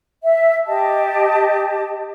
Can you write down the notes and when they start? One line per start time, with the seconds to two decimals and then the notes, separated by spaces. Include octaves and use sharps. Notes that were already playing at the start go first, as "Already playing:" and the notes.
0.22 E5
0.67 G4 D#5 A5